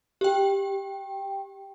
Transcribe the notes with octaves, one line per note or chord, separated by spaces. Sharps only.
G4 G5